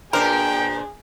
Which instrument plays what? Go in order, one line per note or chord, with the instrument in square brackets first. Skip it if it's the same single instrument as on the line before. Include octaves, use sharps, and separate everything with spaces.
[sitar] A#2 D4 C5 [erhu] G#4 [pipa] A#4 [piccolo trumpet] G5